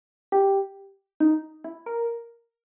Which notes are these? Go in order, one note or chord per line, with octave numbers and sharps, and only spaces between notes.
G4
D#4
E4
A#4